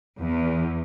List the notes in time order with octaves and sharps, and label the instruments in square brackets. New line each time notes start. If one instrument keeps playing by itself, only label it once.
[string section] E2